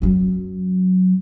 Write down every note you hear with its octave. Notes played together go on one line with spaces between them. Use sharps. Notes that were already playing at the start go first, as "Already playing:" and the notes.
F#2 F#3